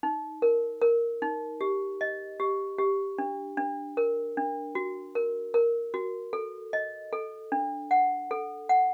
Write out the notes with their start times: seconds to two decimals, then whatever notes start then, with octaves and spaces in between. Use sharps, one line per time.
0.03 D#4
0.42 A#4
0.81 A#4
1.22 D#4
1.61 G4
2.01 D#5
2.40 G4
2.78 G4
3.18 D4
3.57 D4
3.97 A#4
4.37 D4
4.75 F#4
5.15 A#4
5.54 A#4
5.94 F#4
6.33 A4
6.73 D#5
7.13 A4
7.52 D4
7.91 F#5
8.31 A4
8.69 F#5